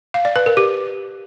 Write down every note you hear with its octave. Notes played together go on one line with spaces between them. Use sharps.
F5
D5
B4
A#4
G4